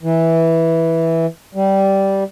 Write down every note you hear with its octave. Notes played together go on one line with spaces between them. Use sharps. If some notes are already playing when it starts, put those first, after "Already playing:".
E3
G3